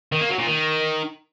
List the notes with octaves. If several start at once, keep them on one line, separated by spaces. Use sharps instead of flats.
D#3
A#3
F#3
A#2
D#3